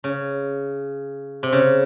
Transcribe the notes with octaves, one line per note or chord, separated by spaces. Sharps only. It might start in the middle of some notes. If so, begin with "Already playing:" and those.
C#3
C3
C#3